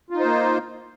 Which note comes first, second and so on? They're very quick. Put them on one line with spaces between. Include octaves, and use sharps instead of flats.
F4 D#4 C5 A#3